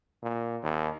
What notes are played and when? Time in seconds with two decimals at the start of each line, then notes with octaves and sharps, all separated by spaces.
0.22 A#2
0.63 D#2